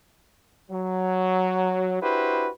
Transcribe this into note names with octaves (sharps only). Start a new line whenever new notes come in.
F#3
D4 E4 F#4 G4 B4 C5